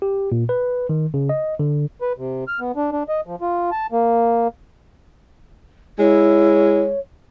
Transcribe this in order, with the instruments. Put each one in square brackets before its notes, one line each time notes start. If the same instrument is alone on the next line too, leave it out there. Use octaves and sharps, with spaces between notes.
[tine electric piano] G4
A#2
B4
D#3
C#3
D#5
D3
[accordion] B4
C3
F6
B3
D4
D4
D#5
F3
F4
A5
A#3
[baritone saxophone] G#3 [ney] E4 [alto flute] C#5